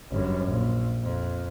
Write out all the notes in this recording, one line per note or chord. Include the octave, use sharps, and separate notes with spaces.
G1 F#2
A#1
F2